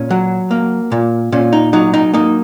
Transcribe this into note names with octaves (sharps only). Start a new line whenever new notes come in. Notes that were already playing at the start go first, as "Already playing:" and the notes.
Already playing: A#2 C#4
F#3
A#3
A#2
A#2 C#4
D#4
F#3 D#4
D#4
A#3 D#4